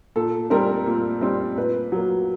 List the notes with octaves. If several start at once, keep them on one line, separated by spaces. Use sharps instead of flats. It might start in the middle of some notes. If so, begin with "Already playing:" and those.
A#2 A4
G3 C4 A#4
A#2
G3 C4
A#2 B4
F#3 A#3